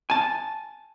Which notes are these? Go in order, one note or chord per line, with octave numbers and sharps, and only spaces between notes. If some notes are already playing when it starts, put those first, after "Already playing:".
G#5 A5